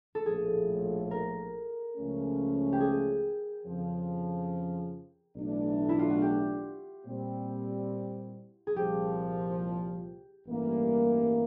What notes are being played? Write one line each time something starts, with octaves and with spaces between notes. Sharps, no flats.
A4
A#1 A2 F3 G#4
A#4
C#2 C#3 F3 A3 C#4
G4
G#4
F2 C#3 F3
B1 A2 E3 A3 D4
E4
F4
F#4
G4
A#2 G3 C4
G#4
C2 A#2 F3 G4
A1 G2 E3 G3 A#3